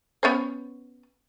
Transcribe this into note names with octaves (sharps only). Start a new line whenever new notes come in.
B3 C#4 C5